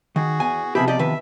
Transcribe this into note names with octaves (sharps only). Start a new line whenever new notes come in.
D#3 F#4 G#4
E2 G#5
C3 F3 B3 G4 G#4 E5 B5
G4 D5 D#5
D#3 B4 E5